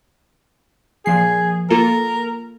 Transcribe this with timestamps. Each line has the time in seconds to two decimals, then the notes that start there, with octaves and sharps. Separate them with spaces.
1.06 A#2 F3 G#4 C7
1.70 A#3 F4 A4 A#4